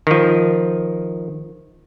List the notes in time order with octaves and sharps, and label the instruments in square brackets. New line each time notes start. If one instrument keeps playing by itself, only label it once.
[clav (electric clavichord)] D#3 F3